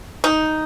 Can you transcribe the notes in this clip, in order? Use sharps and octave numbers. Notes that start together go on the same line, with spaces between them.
D#4